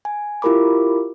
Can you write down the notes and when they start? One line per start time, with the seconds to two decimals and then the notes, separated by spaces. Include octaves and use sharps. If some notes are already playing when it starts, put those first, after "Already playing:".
0.05 G#5
0.42 E4 F4 G4 A#4 B5 D6